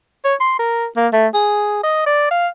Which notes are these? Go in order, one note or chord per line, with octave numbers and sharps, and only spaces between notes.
C#5
C6
A#4
A#3
A3
G#4
D#5
D5
F5